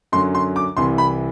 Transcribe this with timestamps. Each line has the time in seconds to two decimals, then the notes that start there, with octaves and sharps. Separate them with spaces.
0.12 F#2 D3 F#3 C6
0.35 C6
0.56 D6
0.77 C2 C3 E3 C6
0.98 B5